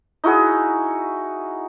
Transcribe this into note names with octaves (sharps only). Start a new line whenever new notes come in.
D#4 E4 F#4 G#4